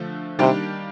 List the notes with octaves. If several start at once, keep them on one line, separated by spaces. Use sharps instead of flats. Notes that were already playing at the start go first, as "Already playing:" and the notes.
Already playing: D3 F3 A3
C3 D#3 G3 A#3 D4 G4